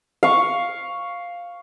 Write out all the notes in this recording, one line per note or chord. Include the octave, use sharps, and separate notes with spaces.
F5 C#6